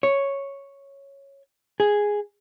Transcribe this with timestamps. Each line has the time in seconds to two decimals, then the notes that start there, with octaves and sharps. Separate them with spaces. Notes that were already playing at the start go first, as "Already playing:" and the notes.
0.03 C#5
1.80 G#4